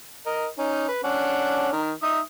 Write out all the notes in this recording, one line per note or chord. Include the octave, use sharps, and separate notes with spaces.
A#4 D#5
C#4 D#4
B4
C#4 D4 F#5
D#3 A#4
D#4 E5 D#6